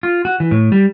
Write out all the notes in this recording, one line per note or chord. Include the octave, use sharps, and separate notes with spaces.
F4
F#4
E3
A2
G3